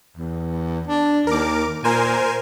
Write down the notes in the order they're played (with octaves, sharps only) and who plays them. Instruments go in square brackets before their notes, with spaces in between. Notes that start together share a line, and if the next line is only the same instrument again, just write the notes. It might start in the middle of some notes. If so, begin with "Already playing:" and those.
[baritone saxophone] E2
D4
[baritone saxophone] D#2 [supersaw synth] A#4 D6
[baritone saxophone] A#2 [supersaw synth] A#4 C5 G#5